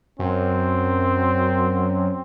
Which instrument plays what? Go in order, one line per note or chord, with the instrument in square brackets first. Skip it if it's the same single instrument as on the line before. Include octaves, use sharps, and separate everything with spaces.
[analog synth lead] F#2 [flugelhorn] C4